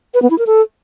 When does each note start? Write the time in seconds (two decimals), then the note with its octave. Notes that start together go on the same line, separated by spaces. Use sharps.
0.14 B4
0.22 B3
0.30 E4
0.39 A#4
0.47 A4